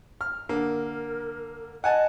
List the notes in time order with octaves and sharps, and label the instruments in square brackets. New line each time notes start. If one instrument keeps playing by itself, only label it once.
[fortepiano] F6
[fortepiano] D3 A#3 [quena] A#4
[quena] D#5 [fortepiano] F#5 G#5 A5